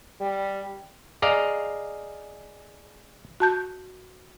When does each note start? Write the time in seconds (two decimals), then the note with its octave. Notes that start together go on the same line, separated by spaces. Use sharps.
0.20 G3
1.22 G#4 D5 D#5 F5 A#5
3.40 F#4 A5 G6